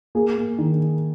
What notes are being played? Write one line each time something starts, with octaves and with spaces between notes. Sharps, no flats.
A#3 G#4
A#3
D#3